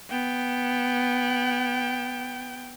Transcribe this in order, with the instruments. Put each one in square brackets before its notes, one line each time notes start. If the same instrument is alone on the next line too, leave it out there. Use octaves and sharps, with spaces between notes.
[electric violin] B3 G5